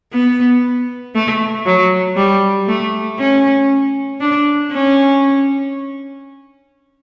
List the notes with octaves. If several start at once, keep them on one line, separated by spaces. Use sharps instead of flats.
B3
A3
F#3
G3
A3
C#4
D4
C#4